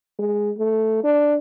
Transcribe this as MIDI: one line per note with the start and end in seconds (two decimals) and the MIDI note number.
0.19 0.51 56
0.58 0.99 57
1.03 1.36 62